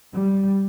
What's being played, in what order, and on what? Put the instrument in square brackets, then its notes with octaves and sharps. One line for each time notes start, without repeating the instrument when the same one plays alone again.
[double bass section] G3